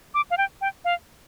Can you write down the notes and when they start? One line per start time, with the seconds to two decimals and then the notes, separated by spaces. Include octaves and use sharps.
0.14 D6
0.31 F5
0.38 G5
0.61 G5
0.85 F5